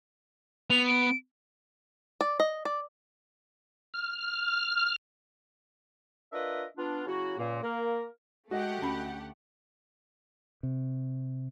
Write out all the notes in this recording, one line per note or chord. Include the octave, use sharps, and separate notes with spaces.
B3 F7
D7
D5
D#5
D5
F6
D4 F4 A#4 B4 D#5 E5
B3 D4 F4
C#3 F#3 E4 F#4
C#2 A#2 A#3
A#3 A#4
G#3 A3 F#4 G4 D#5 F#5
D2 C#4 B5
C3